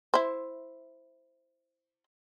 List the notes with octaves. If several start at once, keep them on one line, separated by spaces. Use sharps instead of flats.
E4 C5